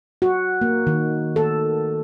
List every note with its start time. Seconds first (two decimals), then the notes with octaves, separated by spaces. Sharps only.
0.22 F#4
0.61 A#3
0.87 D#3
1.36 A4